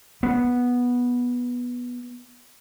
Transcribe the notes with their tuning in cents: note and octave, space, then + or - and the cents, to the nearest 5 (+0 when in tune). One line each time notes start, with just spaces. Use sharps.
B3 -10